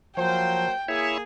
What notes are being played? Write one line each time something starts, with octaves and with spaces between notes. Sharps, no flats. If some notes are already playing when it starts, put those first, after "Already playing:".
F3 F#3 A#3 C5 G5
A#3 E4 G#4 C#5 E5